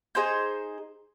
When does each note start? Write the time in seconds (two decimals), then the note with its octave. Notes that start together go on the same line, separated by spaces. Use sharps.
0.15 D#4 G#4 C5 G6